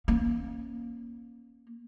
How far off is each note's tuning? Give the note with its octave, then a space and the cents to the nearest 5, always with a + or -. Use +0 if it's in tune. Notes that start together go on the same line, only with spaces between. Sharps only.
A#3 +15 C#4 -15